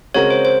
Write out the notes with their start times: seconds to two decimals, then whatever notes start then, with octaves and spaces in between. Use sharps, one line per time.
0.14 C#3 G#3 C4 F#4 A#4 C#5
0.30 C5
0.45 C5